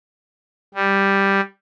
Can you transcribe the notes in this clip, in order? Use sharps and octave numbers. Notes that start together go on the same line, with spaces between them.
G3